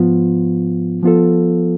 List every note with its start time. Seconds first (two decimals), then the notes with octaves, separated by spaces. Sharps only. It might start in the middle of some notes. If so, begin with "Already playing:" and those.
Already playing: G#2 F3 B3 F4
1.03 F3 B3 F4 A4